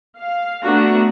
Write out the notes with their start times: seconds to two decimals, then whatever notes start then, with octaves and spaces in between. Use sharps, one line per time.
0.18 F5
0.64 A3 B3 D4 F#4 A#5